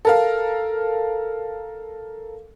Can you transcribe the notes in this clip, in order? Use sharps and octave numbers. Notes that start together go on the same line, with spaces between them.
A4 A#4 F5